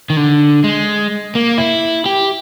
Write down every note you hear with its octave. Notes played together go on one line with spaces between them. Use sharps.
D#3
D3
G#3
A#3
E4
G4